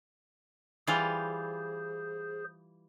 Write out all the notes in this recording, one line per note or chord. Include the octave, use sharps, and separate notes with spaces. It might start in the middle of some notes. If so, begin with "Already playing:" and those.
E3 G3 F4 G#4 C5